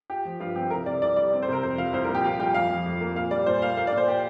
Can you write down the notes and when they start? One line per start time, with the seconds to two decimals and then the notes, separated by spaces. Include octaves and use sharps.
0.10 F4 G4
0.25 F3
0.40 G2 F4
0.56 C4 G4
0.70 C2 A#4
0.86 C3 D5
1.02 C2 D5
1.16 G3 D5
1.33 C4
1.42 C5
1.48 C3 A#4
1.63 F2 C5
1.78 F3 F5
1.93 C2 C5
2.04 A#4
2.09 A#2
2.14 G4
2.24 C2 F4
2.39 G3 G4
2.54 F2 F5
2.70 F3
2.86 F2
3.01 A#3
3.16 A#2 F5
3.31 G3 D5
3.46 A#2 C5
3.62 A#3 F5
3.77 A#3 F5
3.87 D5
3.93 A#2 C5
4.08 G4